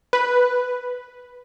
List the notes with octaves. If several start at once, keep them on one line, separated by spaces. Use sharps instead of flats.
B4